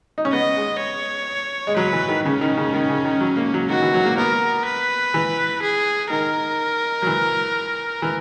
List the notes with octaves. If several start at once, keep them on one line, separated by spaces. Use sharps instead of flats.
D#4
C#4
B3 D#5
G#3
C#5
G#3
F#3 B4
E3
D#3
C#3 C#4
D#3
C#3
D#3
C#3
D#3
F#3
A#3
F#3
D#3 F#4
E3
F#3
A#3
B3 A#4
B4
E3
G#4
D#3 A#4
F#3
E3
E3